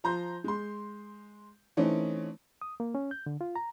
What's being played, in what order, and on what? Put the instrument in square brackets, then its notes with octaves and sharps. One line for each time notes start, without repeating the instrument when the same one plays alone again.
[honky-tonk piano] F3 A#5 C6 G6
G#3 C6
E3 A3 C4 C#4 D#4
[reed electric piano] D#6
A#3
C#4
G6
D3
F4
A#5